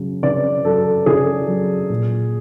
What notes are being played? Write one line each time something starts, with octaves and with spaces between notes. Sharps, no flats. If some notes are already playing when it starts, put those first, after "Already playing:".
Already playing: C#3 F#3
C#3 D5
F#3 A4
C#3 G#4
F#3
A#2